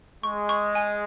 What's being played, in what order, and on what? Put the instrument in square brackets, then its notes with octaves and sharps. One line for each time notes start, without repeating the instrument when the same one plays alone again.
[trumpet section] G#3 [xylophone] C#6
[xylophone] C#6
G#5